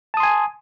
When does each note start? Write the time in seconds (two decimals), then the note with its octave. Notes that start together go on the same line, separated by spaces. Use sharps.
0.14 A5
0.17 D#6
0.20 C6
0.23 G#5